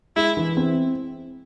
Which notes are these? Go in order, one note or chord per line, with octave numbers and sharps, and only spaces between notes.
G#3 E4
E3
C4